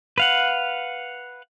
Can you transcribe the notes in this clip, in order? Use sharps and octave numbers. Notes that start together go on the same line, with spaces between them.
B4 F5 F#5